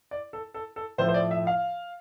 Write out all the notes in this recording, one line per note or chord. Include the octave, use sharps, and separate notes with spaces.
D5
A4
A4
A4
A2 F3 A3 C5
C5
D5
E5
F5